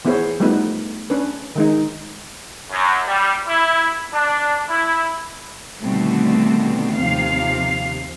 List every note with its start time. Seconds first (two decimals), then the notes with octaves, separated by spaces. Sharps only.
0.05 E3 B3 E4 G#4 C5 C#5
0.40 F3 G3 A3 B3 D#4 B4
1.10 C#4 D4 B4
1.56 D#3 G#3 D#4
2.71 F#2
3.06 G3
3.46 E4
4.12 D4
4.69 E4
5.82 B2 D3 D#3 G3 A3 C4
6.97 D#2 C3 F3 F5